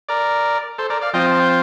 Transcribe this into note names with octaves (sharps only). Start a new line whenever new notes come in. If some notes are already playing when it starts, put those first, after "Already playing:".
A#4 D5
A4 C5
A#4 D5
D5 F5
F3 C4 F4 D#5 G5
A5
G5